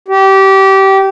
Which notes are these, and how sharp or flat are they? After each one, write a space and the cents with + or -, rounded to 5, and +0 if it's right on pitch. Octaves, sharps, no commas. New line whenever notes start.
G4 -20